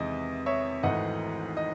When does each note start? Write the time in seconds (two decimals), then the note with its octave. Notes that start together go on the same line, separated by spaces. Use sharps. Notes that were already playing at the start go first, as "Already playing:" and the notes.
Already playing: E2 C3 D#3 G#3 D#5
0.46 C#5 E5
0.83 G#1 G#2 E3 A3 D#4 D#5 F#5
1.57 D#5